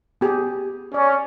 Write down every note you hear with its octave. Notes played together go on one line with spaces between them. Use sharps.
B3 G4 G#4
C#4 D5